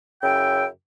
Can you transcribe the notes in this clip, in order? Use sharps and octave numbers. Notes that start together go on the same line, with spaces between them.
F#2 C#3 E4 G5